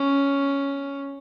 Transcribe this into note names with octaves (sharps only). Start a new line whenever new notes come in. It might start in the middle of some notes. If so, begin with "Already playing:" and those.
Already playing: C#4